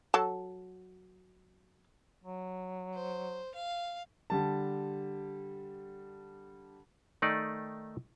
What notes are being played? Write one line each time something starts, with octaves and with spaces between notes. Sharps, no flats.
F#3 A4 A5
F#3
C5
F5
D3 G3 A5
D#3 A3 D#4 D5